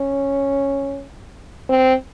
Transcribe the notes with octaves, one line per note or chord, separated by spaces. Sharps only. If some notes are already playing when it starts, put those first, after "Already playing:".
Already playing: C#4
C4